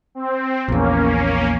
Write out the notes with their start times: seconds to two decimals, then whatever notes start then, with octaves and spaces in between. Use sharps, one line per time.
0.15 C4
0.68 A#1 E2 A#3 C#4